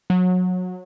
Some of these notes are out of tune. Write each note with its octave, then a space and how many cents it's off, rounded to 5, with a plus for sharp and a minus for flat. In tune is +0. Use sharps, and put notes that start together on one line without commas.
F#3 -25